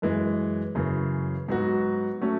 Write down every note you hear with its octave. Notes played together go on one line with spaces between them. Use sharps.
F#2 E3 G#3
F#2 C#3 E3
G#2 F#3 B3 F#4
F#3 A3 C#4